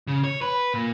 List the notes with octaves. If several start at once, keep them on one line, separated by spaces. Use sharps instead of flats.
C#3
C#5
B4
A#2